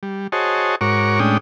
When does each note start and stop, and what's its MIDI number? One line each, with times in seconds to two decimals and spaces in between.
0.03 0.27 55
0.32 0.76 66
0.32 0.76 68
0.32 0.76 72
0.32 0.76 73
0.32 0.76 75
0.32 0.76 81
0.81 1.20 44
0.81 1.20 66
0.81 1.20 70
0.81 1.20 73
0.81 1.20 85
0.81 1.20 86
1.20 1.38 45
1.20 1.38 56
1.20 1.38 61
1.20 1.38 62
1.20 1.38 79
1.20 1.38 87